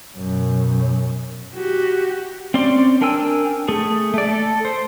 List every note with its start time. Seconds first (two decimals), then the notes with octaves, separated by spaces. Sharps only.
0.17 F#2 B2
1.55 F#4 G4
2.54 C4 C#4 D5 C6
3.01 D4 A#4 G5 G#5 E6
3.68 A3 G#4
4.14 A3 D5
4.28 A4
4.65 C5